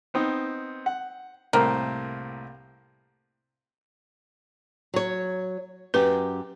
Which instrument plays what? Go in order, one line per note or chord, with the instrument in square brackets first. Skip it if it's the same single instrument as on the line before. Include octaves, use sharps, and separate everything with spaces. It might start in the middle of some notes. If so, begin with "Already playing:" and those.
[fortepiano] B3 C4 D#4
F#5
[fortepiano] C2 A2 C4 [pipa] A#3
[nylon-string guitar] F#3 C#5
[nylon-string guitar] F#2 G4 [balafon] B4